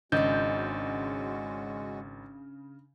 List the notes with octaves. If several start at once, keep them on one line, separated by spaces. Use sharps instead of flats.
G#1 C#3 G#3 C#4 D4 F#4 D#5 G6